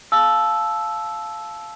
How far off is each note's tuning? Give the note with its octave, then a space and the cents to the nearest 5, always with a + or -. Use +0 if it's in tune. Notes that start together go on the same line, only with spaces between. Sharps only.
F5 +0 A5 -20 E6 +0